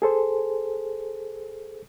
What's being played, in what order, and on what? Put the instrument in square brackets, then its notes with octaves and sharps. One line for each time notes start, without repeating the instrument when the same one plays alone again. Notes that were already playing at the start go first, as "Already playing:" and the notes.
[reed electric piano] G#4 A4 C5